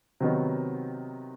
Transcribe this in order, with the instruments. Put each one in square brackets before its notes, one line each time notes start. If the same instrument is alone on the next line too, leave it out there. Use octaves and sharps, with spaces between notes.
[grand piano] C3 D#3 F#3 B3 D#4